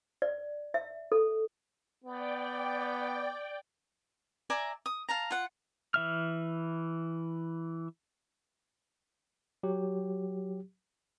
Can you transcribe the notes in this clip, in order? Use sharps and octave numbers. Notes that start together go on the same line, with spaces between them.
D5
E5
A4
B3 D5 G5
D5 E5 G#5 A#5
D#6
F5 A5 A#5
F4 F#5
E3 E5 F6
F#3 G4